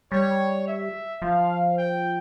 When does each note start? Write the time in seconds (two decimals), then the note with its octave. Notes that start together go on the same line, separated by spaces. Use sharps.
0.12 G3 C#5
0.67 E5
1.22 F3 F5
1.77 G5